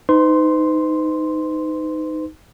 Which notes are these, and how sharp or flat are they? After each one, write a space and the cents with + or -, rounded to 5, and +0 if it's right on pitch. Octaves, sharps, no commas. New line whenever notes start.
D#4 +0 B4 +45 C6 +0